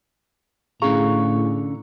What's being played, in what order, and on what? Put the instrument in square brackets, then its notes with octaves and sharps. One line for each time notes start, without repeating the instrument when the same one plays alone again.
[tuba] A2 [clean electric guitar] D3 C#4 A#5 [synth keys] G#4 F5 C#6